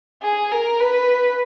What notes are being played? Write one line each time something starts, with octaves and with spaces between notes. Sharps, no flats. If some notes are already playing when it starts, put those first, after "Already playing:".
G#4
A#4
B4